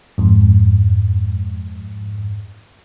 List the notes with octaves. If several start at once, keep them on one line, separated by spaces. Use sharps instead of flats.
F2 G#2